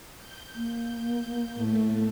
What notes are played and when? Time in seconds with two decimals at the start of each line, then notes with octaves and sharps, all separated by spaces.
0.17 G6
0.55 A#3
1.55 A2 A3